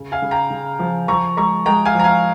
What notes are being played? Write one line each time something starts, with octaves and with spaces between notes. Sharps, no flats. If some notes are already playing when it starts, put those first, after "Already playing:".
Already playing: C#3
F5 G#5
C#3
G5 A#5
C#3
F3
F3 A#5 C#6
G#3 A#5 C#6
G#3 G5 A#5
F5 G#5
F3 A#5
F5 G#5